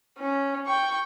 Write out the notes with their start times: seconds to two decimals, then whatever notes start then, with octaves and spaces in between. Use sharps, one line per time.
0.18 C#4
0.67 G5 C#6